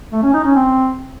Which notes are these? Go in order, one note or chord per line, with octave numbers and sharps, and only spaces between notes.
A3
C#4
D#4
C#4
C4